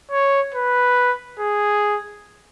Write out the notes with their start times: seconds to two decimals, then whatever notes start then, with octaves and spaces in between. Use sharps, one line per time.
0.11 C#5
0.54 B4
1.39 G#4